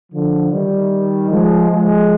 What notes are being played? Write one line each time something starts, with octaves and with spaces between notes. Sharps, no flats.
D3 F3
D#3 G3
F3 G#3
F3 G#3